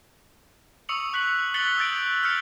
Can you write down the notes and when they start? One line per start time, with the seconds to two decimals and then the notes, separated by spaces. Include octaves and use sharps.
0.89 C#6 D#6 E6 C#7 F7 F#7
1.13 C#6 F#6 B6 C#7 F#7
1.54 F#6 A6 B6 C#7 F#7 G7
1.77 D#6 E6 G6 A6 D7
2.22 E6 F6 G6 A6 C#7 F7